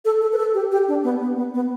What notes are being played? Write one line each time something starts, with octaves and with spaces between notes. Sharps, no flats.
A4
A4
B4
A4
G4
G4
D4
B3
B3
B3
B3